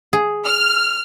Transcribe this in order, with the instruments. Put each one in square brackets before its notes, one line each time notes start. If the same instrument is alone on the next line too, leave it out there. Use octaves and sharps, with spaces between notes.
[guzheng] G#4
[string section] F6